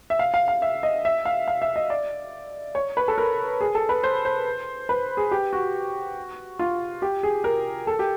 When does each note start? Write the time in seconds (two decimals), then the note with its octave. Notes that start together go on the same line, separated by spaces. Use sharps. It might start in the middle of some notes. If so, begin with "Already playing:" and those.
0.10 E5
0.19 F5
0.34 F5
0.48 F5
0.62 E5
0.83 D#5
1.05 E5
1.25 F5
1.48 F5
1.62 E5
1.76 D#5
1.90 D5
2.75 C#5
2.97 B4
3.08 A4
3.18 A#4
3.61 G#4
3.75 A4
3.89 B4
4.03 C5
4.25 C5
4.89 B4
5.17 G#4
5.31 G4
5.53 F#4
6.59 F4
7.02 G4
7.23 G#4
7.44 A#4
7.87 A4
7.99 G4